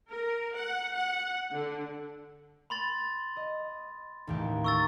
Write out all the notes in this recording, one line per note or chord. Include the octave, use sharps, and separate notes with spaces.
A#4
F#5
F#5
D3
B5 C6 A6
D#5
A1 D#2 G4
A#4 C#6 E6 A6